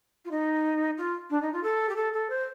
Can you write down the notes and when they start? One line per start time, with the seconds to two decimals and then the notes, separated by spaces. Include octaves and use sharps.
0.25 F4
0.31 D#4
0.98 F4
1.30 D4
1.42 D#4
1.53 F4
1.63 A4
1.89 G4
1.96 A4
2.13 A4
2.30 C5